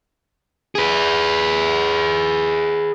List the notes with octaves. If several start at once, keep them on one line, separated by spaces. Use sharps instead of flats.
G#4 B4